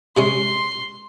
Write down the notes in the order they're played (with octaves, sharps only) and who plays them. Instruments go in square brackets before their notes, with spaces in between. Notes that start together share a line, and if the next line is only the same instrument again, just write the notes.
[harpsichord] C3 G#3 C#4 [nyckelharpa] C6